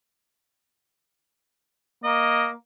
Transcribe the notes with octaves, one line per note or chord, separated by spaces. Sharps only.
A#3 D#5